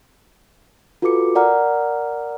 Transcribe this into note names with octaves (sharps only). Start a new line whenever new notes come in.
F4 F#4 A4 B4 D6 C#7
A#4 D5 F#5 A#5 F6